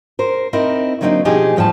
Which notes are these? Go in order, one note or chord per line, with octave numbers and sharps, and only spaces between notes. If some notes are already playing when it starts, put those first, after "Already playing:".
A#4 C5
C4 D#4 E4 A#4
D3 F#3 A#3 C4 D4 D#4
B2 F3 D#4 G4 G#4 G#5
E2 A2 F3 G3 A5